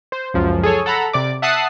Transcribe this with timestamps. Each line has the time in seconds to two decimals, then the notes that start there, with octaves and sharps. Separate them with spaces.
0.12 C5
0.34 C#2 F#2 F3
0.64 G#4 A4 C#5 G#5
0.86 A4 F#5 A#5 B5
1.13 C3 D5 D6
1.42 E5 F#5 A5 D#6 F#6 C7